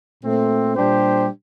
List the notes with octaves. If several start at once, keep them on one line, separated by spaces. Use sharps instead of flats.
A#2 A3 C4
A#2 G3 D4 G4 C5